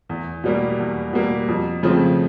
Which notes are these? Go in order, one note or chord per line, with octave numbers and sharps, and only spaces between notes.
E2
B2 G3 A#3
E2
B2 G3 A#3
F2
C#3 F3 A3 C4